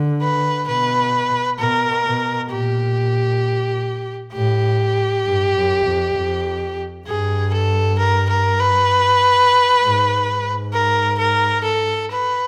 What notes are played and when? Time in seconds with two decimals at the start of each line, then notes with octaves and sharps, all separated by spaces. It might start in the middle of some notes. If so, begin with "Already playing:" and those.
Already playing: D3
0.22 B4
0.68 B2 B4
1.59 B2 A#4
2.05 B2
2.50 A#2 G4
4.33 A2 G4
5.25 G2
5.56 F#2
5.85 F2
6.15 F2
7.07 G2 G#4
7.53 A4
7.98 A#4
8.29 A#4
8.60 B4
9.82 G#2
10.27 G#2
10.73 A#4
11.19 A#4
11.64 A4
12.11 B4